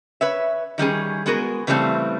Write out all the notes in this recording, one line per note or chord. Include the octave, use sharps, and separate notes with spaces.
B4 C#5 E5
D#3 G3 C#4 G#4
G#3 B3 F#4 G#4 A#4
C#3 E3 G3 A3 C4